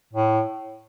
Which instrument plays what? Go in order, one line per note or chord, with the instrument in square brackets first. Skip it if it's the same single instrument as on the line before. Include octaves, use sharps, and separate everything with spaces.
[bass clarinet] A2